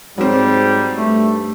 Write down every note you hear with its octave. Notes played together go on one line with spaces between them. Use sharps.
G#2 F#3 G3 C4
G2 A3